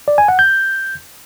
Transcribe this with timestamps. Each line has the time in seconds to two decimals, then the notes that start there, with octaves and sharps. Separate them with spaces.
0.08 D5
0.18 G#5
0.28 F#5
0.39 G6